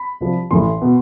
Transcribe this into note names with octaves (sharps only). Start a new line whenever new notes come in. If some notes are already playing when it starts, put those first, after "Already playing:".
Already playing: B5
C2 C3 F3
A1 A2 E3 C6
B2